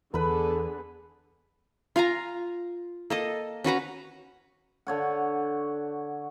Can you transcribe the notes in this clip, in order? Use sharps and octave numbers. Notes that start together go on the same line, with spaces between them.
E2 D3 B3 G#4 A4 B4 B5
F4 F5 G#5 A#5
A#3 A4 D#5
C#4 F#4 B4 A#5
D3 C#5 F#5